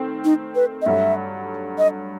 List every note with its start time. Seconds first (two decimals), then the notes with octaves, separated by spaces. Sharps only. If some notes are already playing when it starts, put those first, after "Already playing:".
Already playing: D#3 A3 C4
0.25 D#4
0.55 B4
0.82 D#5
0.86 G2 F#3 A3 E5
1.78 D#5